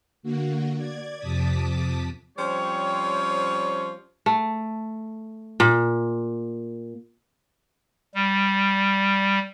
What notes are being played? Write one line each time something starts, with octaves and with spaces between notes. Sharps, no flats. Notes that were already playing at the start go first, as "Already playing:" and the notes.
D3 A#3 F#4
D5 G#6
F2 C3 A5 D6 D#6 B6
F3 G3 C4 C#4 C5 C#5
A3
A#2
G3